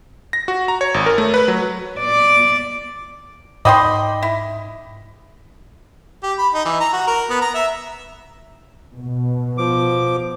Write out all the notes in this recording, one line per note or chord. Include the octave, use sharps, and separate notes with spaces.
A#6
F#4
A#5
C#5
G#1
A#4
A3
B4
F#3
D5
G#2 D5 D#5 G5 B5 C6 D#6
E4
G4
B5
D#4
E3
A#5
F#4
A#4
B3
A#5
E5
B2
F3 D6